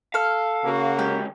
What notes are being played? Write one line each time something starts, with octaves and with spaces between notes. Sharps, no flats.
A4 F5 F6
C#3 A#3 F#4
D3 G#3 G4